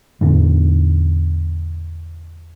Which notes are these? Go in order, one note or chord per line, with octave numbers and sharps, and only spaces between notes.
E2 A2 D3 B3